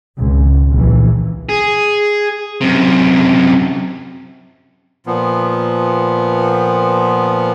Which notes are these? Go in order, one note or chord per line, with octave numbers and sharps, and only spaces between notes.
G#1 C#2
A#1 D#2 E3
G#4
F#2 C3
A#2 F3 B3